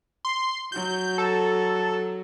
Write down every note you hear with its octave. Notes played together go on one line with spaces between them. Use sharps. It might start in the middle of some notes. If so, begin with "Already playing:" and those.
C6
F#3 F#4 G6
A4